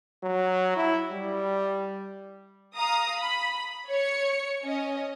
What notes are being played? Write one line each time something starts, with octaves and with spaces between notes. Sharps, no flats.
F#3
E4
G3
F5 A#5 D#6
B5
C#5 C#7
C#4 D#5